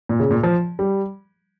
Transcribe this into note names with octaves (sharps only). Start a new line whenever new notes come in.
A#2
C#3
A#2
F3
G3